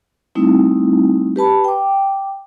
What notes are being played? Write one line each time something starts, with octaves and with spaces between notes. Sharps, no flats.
G3 A3 C4 D#4 E4
G4 B4 A5 B5
G5 D6